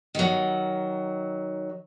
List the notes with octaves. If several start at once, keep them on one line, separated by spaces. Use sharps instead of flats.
D#3 F#3